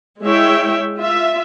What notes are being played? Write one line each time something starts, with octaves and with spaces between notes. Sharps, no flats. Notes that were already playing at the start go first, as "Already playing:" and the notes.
G#3 E4 G#4 C#5 E5 G5
F4 E5